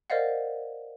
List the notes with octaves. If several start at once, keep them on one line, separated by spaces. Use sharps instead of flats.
A#4 C5 D5 D#5 F5 F#5